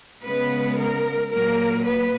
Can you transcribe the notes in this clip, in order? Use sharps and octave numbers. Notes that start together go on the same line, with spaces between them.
C#3 G#3 B3 B4
A#4
A#2 F#3 A#3 A#4
B4